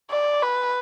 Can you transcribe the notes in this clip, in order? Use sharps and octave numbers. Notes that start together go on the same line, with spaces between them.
D5
B4